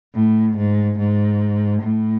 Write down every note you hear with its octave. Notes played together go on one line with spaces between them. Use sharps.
A2
G#2
G#2
A2